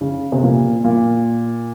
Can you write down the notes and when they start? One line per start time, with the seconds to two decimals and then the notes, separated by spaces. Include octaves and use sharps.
0.01 C#3
0.32 C3
0.43 A#2
0.84 A#2